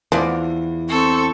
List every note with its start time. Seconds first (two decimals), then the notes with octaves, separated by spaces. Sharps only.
0.12 E2 F3 D5
0.89 C4 A4 C#6